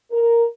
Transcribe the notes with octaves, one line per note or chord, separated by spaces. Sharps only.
A#4